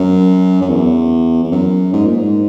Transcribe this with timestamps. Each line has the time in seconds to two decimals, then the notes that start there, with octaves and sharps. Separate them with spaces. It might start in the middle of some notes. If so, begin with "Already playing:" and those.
Already playing: F#2
0.61 F#2
0.70 E2
1.44 E2
1.52 F#2
1.93 G#2
2.06 A#2
2.18 G#2